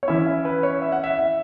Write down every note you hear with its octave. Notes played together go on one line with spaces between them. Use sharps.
C#5
E3 C#4 E4 E5
E5
B4
C#5
E5
F#5
E5
E5